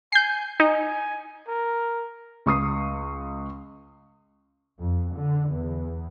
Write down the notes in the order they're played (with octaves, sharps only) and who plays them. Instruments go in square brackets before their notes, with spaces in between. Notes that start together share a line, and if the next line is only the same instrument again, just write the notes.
[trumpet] G#5 [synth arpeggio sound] G6 C7
[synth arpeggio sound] D#4 [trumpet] G#5
[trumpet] A#4
[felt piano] C#2 C#6 D#6 C7
[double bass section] F2
D3
E2